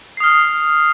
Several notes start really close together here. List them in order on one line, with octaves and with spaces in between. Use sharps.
C7 D#6 F6